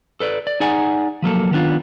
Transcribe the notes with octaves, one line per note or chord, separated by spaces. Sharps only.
A4 B4 D5
D5
D#4 G#4 D5 F#5 G#5
F3 F#3 A#3 A4
D#3 B3 D4 F4